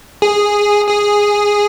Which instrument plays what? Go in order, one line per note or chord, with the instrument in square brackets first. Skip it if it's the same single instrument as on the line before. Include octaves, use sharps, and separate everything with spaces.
[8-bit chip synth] G#4
G#4